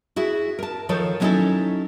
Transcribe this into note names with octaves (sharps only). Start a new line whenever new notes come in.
E4 F#4 G#4 E5
A#4 A5
D#3 F3 F4 A4 C#5
F#3 B3 C#4 D#4 E4 A4